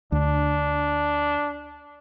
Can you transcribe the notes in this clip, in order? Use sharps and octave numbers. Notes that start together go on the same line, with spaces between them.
D2 D4